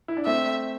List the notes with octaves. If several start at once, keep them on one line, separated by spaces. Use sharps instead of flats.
E4
D4
A3 C4 E5